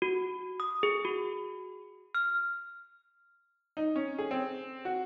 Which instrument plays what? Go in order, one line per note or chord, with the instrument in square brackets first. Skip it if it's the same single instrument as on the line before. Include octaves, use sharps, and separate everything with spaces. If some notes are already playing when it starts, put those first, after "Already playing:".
[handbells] F#4
D#6
G#4
F#4
F6
[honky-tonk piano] D#4
C#4
G#4
C4
F#4